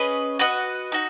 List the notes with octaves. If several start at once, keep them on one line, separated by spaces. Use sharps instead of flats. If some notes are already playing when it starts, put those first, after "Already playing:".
Already playing: C#4 G#4 B4 D#5
F#4 B4 D#5 F#5
D#4 F#4